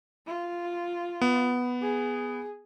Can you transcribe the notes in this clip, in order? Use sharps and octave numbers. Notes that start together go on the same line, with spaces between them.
F4
B3
G#4